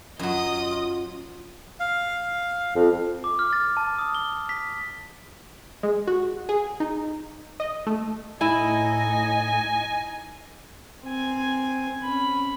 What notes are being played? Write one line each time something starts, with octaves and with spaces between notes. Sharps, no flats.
F#2 F#3 F4 D#5 D#6
F5
F2
D6
F6
A6
A5
D#6
G7
B6
G#3
F#4
G#4
D#4
D#5
A3
A2 D#4 E4 D#5 G#5
C4 G#5
C#4 B5